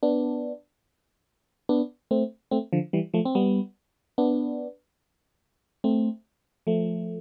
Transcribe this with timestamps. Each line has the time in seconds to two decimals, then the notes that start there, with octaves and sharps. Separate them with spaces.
0.03 B3 D4
1.69 B3 D4
2.11 A3 C4
2.51 A3 C4
2.73 D3 F3
2.93 E3 G3
3.14 F3 A3
3.25 C4
3.35 G3 B3
4.18 B3 D4
5.84 A3 C4
6.67 F3 A3